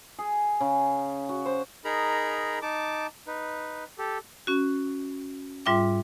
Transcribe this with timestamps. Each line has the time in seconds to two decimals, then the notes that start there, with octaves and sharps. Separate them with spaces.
0.19 G#4
0.60 C#3
1.29 F#4
1.45 C5
1.85 D#4 G#4 A#4 A#5 B5
2.62 D#4 A5 D6
3.27 D#4 B4
3.98 G4 A4
4.47 C#4 F#4
5.66 G#2 G3 F4 E5 G5 D6